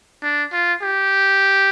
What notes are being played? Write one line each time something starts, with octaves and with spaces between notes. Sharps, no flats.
D4
F4
G4